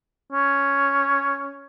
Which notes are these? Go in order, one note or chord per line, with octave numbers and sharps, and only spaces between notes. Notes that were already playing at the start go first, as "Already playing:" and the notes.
C#4